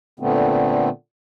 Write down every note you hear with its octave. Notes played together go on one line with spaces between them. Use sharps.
A#2 D3 A3 B3 C4